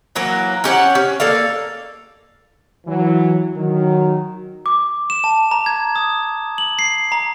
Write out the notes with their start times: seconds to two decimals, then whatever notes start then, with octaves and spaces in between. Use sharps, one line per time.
0.15 E3 F#3 A#3 A#4
0.64 C#4 G4 C#5 F#5
0.95 C#4
1.20 A#3 A4 D5 F5
2.86 E3 F#3
3.55 D#3 F#3
4.66 D6
5.10 E7
5.24 A5
5.51 A#5
5.66 G#6
5.96 D#6
6.58 F#7
6.79 C7
7.12 A#5